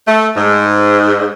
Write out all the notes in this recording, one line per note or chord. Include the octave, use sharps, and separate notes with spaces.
A3
G#2